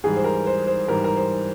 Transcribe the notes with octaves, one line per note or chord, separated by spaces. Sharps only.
G#2 E3 G3 G#4
C5
A#4
C5
C5
G#2 E3 G3 A#4
A#4
C5